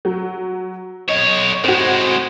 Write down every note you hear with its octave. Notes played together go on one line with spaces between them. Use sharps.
F#3
B1 C#5 D#5
A2 G#3 C4 F#4